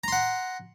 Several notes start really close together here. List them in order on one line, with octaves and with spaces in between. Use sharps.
A#5 C6 F#5